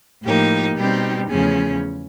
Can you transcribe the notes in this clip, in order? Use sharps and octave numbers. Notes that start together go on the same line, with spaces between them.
A2 F3 A#3 D#4 G4
B2 G3 C4 D#4 G4
E2 C#3 F3 A3 C#4 G#4